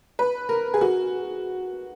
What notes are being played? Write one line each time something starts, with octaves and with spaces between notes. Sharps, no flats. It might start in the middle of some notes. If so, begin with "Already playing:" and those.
B4
A#4
G#4
F#4